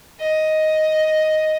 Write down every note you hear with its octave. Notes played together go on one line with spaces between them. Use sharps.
D#5